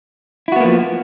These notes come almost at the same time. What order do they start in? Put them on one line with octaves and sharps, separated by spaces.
E4 F#4 B3 A#3 F3